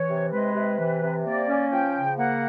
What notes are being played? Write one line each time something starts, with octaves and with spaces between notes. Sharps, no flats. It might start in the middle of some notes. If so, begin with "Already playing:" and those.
Already playing: E3 C#5
C3
G#3 B4
C3
E3
C3
A#3 D5
C#4
F3 G5
C#3
A#3 F#5